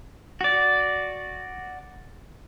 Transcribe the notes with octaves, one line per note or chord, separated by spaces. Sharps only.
F#4 D5